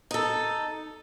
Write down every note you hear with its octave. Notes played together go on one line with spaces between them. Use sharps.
D#4 A4